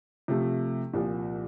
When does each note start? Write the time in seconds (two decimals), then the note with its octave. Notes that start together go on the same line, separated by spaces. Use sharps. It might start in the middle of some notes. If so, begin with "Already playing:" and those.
0.28 C3 F3 A3
0.93 C2 A#2 F3